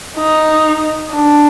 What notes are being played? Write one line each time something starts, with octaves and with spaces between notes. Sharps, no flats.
D#4
D4